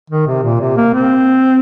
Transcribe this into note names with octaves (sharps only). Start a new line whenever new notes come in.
D#3
C3
A#2
C3
A#3
C4